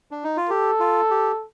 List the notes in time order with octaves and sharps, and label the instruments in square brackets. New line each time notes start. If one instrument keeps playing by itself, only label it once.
[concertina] D4
D#4
F4
[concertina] G4 [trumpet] A4
[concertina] F4
G4